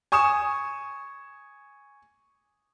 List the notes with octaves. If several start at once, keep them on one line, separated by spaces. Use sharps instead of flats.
G#5 C#6 D#6 E7